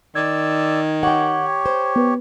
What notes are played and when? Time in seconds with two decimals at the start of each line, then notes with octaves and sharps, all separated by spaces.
0.15 D#3 D5 E6 G#6
1.03 G4 C#5 F#5 G5
1.66 C5
1.96 B3 B4